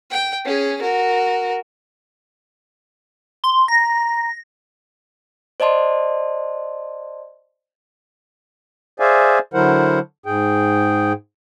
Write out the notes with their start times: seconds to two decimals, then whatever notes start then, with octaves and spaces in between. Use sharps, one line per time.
0.11 G5
0.45 C#4 G#4
0.82 F#4 A#4
3.44 C6
3.68 A#5 A#6
5.60 C5 D5 D#5 A5 C6
9.00 G#4 C5 D5 E5 F5 G#5
9.54 D3 F#3 E4 A#4 C5 F#5
10.26 G#2 G#4 G5